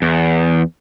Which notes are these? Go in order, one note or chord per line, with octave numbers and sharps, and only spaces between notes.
E2